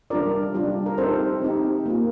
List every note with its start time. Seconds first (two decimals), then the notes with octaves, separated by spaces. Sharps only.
0.10 G3 D4 F4 A#4 D5
0.54 G3 D4 F4
0.86 A#4
0.98 C4 D#4 G4 A4 C5
1.42 C4 D#4 G4
1.86 A#3 F4